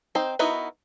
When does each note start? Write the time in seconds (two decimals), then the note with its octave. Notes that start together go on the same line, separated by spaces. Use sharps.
0.15 C4 D#4 C5
0.39 B3 D#4 E4 F#4 A#4